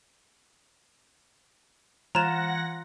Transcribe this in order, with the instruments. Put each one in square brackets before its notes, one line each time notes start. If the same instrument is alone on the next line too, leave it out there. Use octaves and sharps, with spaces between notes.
[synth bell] E3 F#6 G#6 [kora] F4 [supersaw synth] F#5 A#6 [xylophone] A#5 E7